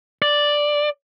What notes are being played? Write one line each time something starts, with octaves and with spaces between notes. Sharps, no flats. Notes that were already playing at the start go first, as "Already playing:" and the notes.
D5